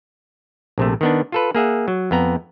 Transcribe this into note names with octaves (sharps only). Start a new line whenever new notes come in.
A#1 C3 A3
D#3 B3 D4
F4 A4 B4
A#3 G#4 E5 F#5
F#3
F2 B3 A#5